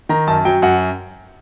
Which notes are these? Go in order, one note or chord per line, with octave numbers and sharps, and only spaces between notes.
D#3 A#5
F#2 A5
F#3 G5
F#2 F#5